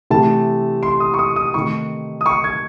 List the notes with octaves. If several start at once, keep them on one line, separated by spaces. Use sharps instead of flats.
C3 E3 A3 A5
C6
D#6
C#6
D#6
D#6
C3 D#3 A3 D#4 C#6
D#6
C#6
G#6